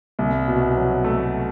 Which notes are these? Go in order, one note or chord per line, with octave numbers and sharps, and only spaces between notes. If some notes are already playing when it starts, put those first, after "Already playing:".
C2
B2
F#3
A3